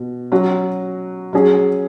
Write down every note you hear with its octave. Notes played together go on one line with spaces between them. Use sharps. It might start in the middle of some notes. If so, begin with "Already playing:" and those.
Already playing: B2
F#3 C#4 F#4
F#3 C#4 G#4